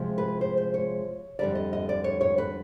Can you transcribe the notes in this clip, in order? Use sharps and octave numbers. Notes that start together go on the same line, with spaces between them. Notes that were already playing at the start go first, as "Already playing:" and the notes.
Already playing: C3 F3 G#3
B4
C5
C5
C#5
F2 D3 G3 D5
D#5
D#5
D5
C#5
C#5
B4